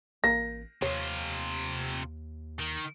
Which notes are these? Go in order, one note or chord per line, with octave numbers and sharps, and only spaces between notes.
A1 A#3 A#6
D#2 C3 F4 C#5
D#3